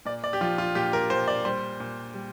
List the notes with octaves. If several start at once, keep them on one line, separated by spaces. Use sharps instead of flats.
A#2 D5
D5
G4
F3 F4
F4
A#2 G4
A#4
A#2 C5
D5
G3 C5
A#2
G3